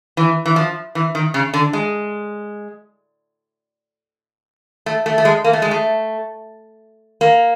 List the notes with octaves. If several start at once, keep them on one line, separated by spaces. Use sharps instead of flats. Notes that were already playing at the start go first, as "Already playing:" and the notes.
E3
E3
F3
E3
D#3
C#3
D3
G#3
A3
A3
A3
G#3
A#3
A3
G#3
A3
A#3